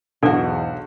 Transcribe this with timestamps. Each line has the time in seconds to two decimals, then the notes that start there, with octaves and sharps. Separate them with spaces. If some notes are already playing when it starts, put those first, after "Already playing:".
0.23 B1 E2 G#2 D4 F#4 A4 D5